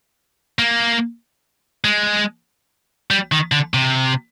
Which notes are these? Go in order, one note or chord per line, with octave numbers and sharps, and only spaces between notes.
A#3
G#3
G3
D#3
D3
C3